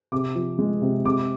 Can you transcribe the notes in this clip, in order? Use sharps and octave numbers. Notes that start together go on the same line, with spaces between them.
C3 D6
F3
G#3
C3
C3 D6